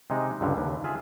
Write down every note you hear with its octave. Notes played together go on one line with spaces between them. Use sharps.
C3 G#3 D#4
C#2 G2 D3
D#2
F4 G#4 E5